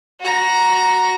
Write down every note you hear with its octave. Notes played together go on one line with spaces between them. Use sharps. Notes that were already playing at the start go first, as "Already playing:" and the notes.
F#4 A#5